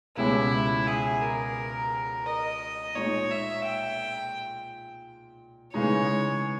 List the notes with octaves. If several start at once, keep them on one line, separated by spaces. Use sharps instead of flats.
C#2 B2 G#3 C#4 E4 G4
G#4
A#4
D#5
A#2 G#3 D#4 C#5
E5
G5
C#3 E3 G#3 D#4 C#5